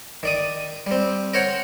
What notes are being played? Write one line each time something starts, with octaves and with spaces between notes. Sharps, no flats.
D#3 D5 D#6
G3 C4
A#4 C5 C#5 F#5